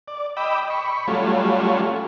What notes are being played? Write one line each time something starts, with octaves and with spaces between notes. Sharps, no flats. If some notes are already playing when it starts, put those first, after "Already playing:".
D5
D#5 G5 B5 D6 E6
B5 C#6
F#3 G3 A3 C#4 F4